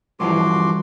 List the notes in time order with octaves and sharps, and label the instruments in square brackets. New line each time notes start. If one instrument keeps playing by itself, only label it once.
[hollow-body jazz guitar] G2 E3 F3 [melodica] F#4 C6 D6